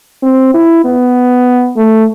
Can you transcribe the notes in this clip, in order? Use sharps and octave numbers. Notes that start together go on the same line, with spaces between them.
C4
E4
B3
A3